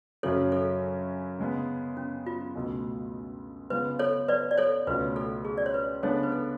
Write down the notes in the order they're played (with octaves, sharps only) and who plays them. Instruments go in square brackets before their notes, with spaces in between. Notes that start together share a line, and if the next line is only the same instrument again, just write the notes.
[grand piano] F#2 C#3 F#3 C#4 [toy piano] A4 C#5
[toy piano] A4
[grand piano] C#3 G#3 B3
[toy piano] C#4
F4
[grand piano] C#2 B2 A3
[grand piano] C#3 G#3 B3 F4 [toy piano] B4
[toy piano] A4 C#5
B4 D5
D5
A4 C#5
[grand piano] C#2 B2 A3 F4 [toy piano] B4
[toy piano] A4
G#4
D5
C#5
B4
[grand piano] C#3 G#3 B3 D4 [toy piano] A4 C#5
[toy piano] B4
A4